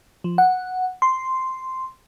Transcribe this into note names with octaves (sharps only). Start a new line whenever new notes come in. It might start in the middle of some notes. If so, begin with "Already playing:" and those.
F3
F#5
C6